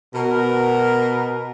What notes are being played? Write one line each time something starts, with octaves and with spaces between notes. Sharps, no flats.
B2 A#4